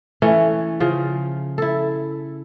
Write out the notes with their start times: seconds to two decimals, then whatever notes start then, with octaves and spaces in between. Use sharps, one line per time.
0.22 E3 A3 C#4
0.80 C#3 F3
1.58 E4 A4